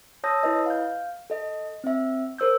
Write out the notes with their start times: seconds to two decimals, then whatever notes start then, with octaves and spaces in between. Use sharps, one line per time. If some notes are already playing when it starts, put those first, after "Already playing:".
0.24 C#5 A5 D#6 E6 G6 A#6
0.43 E4 B4 D#5
0.66 F5 G6
1.30 A4 D#5
1.84 C4 E5
2.38 A#4 C5 E6 G6